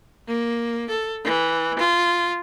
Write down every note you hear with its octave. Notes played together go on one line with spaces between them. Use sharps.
A#3
A4
E3
F4